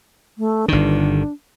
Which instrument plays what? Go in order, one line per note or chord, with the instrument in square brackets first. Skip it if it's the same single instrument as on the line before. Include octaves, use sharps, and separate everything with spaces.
[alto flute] A3
[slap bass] G1 D#3 [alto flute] D4